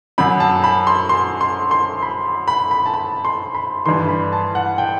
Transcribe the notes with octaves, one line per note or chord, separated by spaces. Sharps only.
F#2 F#3 B5
A5
B5
C6
C6
C6
C6
B5
B5
B5
A5
B5
C6
B5
G2 E3 C6
B5
A5
F#5
G5